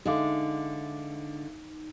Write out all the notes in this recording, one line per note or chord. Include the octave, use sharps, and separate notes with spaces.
D3 G#3 D#4 E5 F5 D6